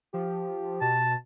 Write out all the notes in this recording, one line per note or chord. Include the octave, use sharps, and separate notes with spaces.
F3 G4
B2 A5